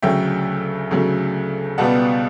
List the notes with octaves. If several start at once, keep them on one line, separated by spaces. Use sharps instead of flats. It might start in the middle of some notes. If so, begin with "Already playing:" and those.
D2 C#3 F#3 A3 E5 G5
D2 C#3 F#3 A3
C#2 B2 G3 B3 F#5 A5